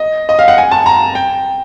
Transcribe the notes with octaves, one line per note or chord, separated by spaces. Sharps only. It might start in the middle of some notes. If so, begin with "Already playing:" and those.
Already playing: D#5
D#5
F5
F#5
G#5
A5
A#5
G5